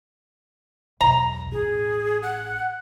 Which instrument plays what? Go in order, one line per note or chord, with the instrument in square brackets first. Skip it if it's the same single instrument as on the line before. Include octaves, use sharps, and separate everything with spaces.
[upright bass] B1 E2 [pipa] A#5
[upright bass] A1 [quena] G#4
[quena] F#5